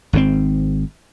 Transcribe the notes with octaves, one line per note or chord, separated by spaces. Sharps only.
G#1 G#2 C#3 C4